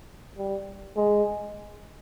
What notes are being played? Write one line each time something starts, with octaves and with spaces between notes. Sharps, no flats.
G3
G#3